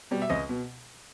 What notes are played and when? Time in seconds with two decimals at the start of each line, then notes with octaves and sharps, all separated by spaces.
0.11 B2 G3
0.22 E5
0.29 C#2 D#5
0.49 B2